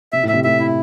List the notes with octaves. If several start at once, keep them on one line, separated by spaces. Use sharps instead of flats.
C3 E5
A2
C3 E5
A2 E5
E4